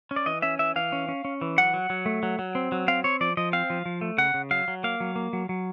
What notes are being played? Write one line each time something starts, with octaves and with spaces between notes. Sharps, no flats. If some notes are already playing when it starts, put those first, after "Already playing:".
C#4
D5
E3 D#5
C#4 E5
E3 E5
E3 F5
C#4
C#4
C#4
E3
F#3 F#5
F#3
F#3
A3
F#3
F#3
C4
F#3
C4 F5
C4 C#5
F3 D5
F3 D#5
C4 F5
F3
F3
A3
C#3 F#5
C#3
F#3 F5
F#3
A#3 F5
F#3
A#3
F#3
F#3